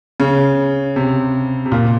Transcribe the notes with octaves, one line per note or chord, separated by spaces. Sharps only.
C#3
C3
C3
A#2